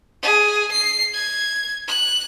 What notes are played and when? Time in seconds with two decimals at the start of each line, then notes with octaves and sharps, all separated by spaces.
0.23 G#4
0.72 C7
1.14 G#6
1.88 F#6